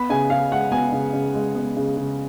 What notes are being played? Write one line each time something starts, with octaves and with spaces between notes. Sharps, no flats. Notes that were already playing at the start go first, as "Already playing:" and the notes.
Already playing: B3 B5
C#3 G#5
C#3 F5
G#3 F#5
B3 G#5
C#3
C#3
G#3
B3
C#3
C#3